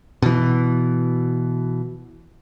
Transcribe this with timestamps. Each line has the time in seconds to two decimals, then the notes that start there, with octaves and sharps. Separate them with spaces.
0.22 B2 E3